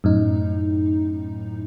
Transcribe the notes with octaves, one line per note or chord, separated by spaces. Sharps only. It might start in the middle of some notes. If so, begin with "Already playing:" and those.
F#2 A2 D#4